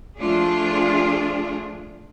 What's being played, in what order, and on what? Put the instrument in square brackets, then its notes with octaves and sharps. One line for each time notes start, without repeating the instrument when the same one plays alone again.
[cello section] F3 A3 D4 F4 G#4